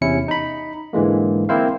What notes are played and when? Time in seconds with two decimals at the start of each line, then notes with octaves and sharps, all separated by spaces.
0.01 E2 C3 C#4 E4 C#7
0.28 D#4 B5
0.93 G#2 D3 E3 G#3 A#3
1.49 A#3 C4 E4 C5 F5